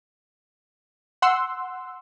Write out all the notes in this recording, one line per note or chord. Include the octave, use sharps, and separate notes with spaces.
F#5 C6 E6